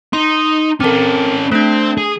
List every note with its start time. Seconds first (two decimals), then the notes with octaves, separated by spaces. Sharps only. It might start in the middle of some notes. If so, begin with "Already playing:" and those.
0.13 D#4 C6
0.80 C4 C#4 A4 A#4
1.52 A3 C4 D4
1.98 G#4